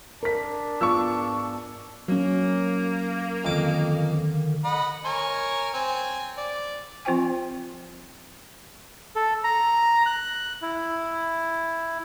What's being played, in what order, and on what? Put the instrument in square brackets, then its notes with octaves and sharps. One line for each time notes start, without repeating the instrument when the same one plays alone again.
[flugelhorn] D4 [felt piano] A#4 B6
[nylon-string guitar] G#2 B3 F4 [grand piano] C#6 E6
[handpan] F#3 C#4 [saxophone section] A#3
[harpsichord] F2 D6 [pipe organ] D3 D#3
[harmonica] D#5 F#5 B5
A#4 C#5 G#5
C4 G#5
D5
[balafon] F3 C4 F4 C5 G5 G#5
[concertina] A4
A#5
F#6
E4